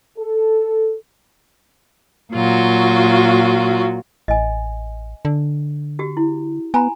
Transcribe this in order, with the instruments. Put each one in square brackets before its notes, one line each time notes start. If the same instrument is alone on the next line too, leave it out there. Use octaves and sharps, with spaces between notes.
[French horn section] A4
[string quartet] A#2 F#3 F4 F#4
[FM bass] A1 [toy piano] D#5 G#5
[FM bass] D3
[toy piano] F#4 G4
E4
[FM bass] B3 [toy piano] G#5 A#5 B5